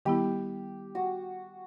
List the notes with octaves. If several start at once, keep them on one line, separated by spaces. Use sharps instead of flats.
D#3 G3 B3 E4 G4
F#4